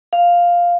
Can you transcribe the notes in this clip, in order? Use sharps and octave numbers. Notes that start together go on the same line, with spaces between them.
F5